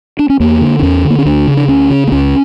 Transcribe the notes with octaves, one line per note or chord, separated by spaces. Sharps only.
D4
C#4
E2 A#3
D3
D4
E2 C#4
D3
A#3
C#4
D2 D4
C#3
D4
D2 C#4
C#3
A#3
C#2 C#4